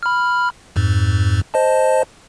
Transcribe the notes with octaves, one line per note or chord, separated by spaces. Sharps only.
B5 F6
F2 G#2
C5 D#5 A5